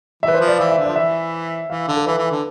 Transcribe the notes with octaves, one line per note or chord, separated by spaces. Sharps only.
E3 E5
B4
C5
F3
D5
E3 F5
E5
D3
F3 D5
E3 E5
E3 F5
D3 F5
A4
E3 B4
E3
D3